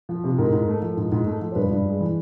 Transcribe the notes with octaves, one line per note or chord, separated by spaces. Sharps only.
F3
C3
G#2 A#4
G#2
A3
F3
G#2
G#2
A3
F3
C5
G2 B4
G2
G#3
E3